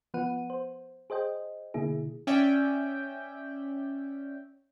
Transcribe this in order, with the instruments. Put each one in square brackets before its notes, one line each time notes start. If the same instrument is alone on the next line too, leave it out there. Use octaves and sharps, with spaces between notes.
[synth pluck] F3 B3 B4 F#5 D#7
C5
G#4 C5 D#5 G5
B2 D3 A#3 E4 G#4
[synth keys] C#4 D5 E5 G5